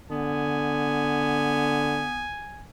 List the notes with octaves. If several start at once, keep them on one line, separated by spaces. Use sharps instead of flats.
D3 B3 G#5